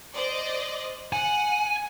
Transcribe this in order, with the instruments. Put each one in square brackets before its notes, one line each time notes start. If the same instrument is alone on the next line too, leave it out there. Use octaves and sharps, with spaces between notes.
[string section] C5 D5 D#5
[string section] F#5 [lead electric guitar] G#5